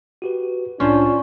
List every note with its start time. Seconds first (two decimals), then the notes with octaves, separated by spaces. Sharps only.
0.22 F#4 G4 B4
0.80 C2 A2 C#4 D4 F4 C5